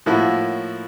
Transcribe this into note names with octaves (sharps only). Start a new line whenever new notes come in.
A2 F3 A#3 E4 F#4